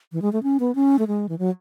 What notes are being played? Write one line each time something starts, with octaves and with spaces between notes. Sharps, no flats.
E3
G#3
A3
C#4
B3
C#4
A3
G#3
E3
F#3